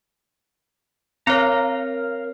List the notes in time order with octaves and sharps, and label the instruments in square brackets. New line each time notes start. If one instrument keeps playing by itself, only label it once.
[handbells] C4 C#5 [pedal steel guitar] A#4 F5 A#5